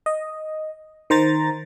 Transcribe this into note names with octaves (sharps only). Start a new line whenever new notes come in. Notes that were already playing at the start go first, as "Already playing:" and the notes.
D#5
D#3 C5 A#5 A6